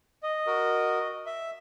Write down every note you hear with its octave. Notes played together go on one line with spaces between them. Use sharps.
D#5
F#4 A#4
E5